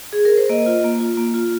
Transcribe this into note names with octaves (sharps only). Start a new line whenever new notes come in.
G#4
A#4
C5
A#3 D#5
F4
A#3
F4
A#3
F4